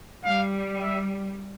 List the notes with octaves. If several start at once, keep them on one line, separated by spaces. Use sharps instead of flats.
G3 F5
E5